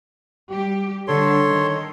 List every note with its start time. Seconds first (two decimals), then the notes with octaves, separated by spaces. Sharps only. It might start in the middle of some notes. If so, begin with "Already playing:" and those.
0.50 G3 G4
1.08 D3 G3 A4 C#5 C6
1.47 D#3